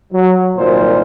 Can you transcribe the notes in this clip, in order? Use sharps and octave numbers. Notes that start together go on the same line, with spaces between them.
F#3
C2 A#2 D#3 C5